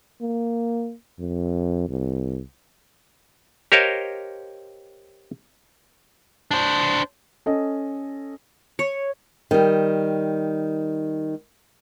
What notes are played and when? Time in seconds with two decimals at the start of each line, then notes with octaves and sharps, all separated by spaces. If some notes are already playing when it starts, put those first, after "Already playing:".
0.22 A#3
1.20 F2
1.89 C2
3.72 G4 A#4 C5 C#5 D#5 F5
6.51 D4 C5
7.46 C#4 A4 D#5
8.79 C#5
9.51 D#3 G3